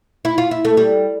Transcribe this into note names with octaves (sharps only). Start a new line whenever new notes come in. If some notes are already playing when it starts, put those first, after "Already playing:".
E4
F4
E4
A3
G3